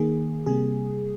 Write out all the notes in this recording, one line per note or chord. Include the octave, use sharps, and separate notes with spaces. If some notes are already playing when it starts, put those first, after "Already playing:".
Already playing: D#3 A#3 G#4
C3 G3 A#3 G#4